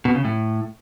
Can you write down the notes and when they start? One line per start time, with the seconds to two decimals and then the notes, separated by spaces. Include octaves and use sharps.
0.05 B2
0.15 C#3
0.25 A2